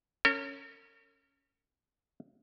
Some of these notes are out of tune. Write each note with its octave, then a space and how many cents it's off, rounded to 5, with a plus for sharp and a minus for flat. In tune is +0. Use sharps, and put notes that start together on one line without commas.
C#4 +0 A#4 -40